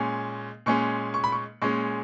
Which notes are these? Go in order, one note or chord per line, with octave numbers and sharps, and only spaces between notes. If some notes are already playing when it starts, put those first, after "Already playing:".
Already playing: A#2 G#3 C#4
A#2 G#3 C#4 C#6
C#6
B5
C#6
A#2 G#3 C#4 C#6